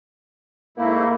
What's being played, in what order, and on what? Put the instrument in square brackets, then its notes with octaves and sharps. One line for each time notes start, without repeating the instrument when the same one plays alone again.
[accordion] G#2 A3 E4 [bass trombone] A#3